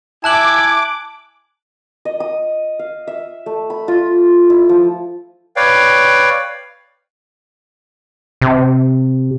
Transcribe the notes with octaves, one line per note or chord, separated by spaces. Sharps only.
E4 G#5 A5 D6 F#6 F#7
D#5
D#6
F5
E5
A3
B5
F4
E4
F3
B4 C#5 D5 F5 G5
C3